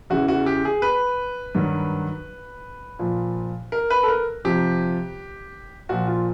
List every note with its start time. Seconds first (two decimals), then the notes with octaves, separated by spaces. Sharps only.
0.10 E2 C#3 E3 F#4
0.28 F#4
0.46 G4
0.65 G#4
0.82 B4
1.55 G2 D#3 F#3
2.99 A#2 F3
3.72 A#4
3.90 B4
4.03 A4
4.08 A#4
4.45 F2 C3 F3 G4
5.89 A#2 F3 F#4
6.08 F4